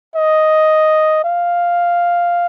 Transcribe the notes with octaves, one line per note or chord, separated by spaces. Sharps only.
D#5
F5